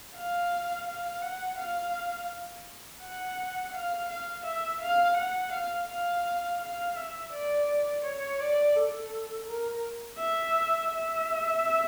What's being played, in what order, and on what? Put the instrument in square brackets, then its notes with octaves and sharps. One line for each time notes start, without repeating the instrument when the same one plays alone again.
[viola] F5
F5
F#5
F5
F#5
F5
F5
E5
F5
F#5
F5
F5
F5
E5
D5
C#5
D5
A4
A#4
E5
E5